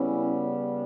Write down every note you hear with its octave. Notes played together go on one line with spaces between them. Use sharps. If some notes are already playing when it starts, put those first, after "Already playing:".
Already playing: C#3 G3 B3 C#4 E4